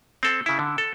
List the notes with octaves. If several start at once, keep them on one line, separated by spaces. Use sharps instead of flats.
C4 A4
C#3 E4
D3
A4